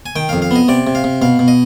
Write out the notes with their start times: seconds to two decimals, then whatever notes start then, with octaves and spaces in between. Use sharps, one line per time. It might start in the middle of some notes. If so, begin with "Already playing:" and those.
0.06 G#5
0.16 D#3 G5
0.29 F5
0.33 F2
0.42 F5
0.51 B3 D#5
0.68 C3 D5
0.87 C3
0.95 F5
1.04 C3
1.22 B2 F5
1.39 B2
1.48 D#5